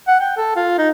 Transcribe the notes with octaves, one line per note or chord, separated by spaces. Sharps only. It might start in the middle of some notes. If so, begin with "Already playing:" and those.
F#5
G5
A4
F4
D#4